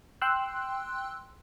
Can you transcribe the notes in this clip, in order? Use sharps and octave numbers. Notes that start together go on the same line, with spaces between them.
G5 C6 E6 F#6